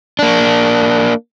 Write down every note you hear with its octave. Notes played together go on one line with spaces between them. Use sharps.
A#3 D4